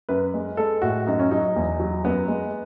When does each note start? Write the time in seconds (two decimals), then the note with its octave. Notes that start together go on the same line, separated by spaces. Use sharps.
0.09 F#2 B4
0.34 G#3
0.57 G#3 A4
0.82 A2 F#4
1.06 F#2 D#4
1.19 C#4
1.31 F#3 D#4
1.56 E2
1.80 F#3
2.04 F#2 B3
2.28 G#3